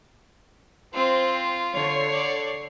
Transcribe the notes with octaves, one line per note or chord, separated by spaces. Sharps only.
C4 F4 C5
D3 C#5 C7
D5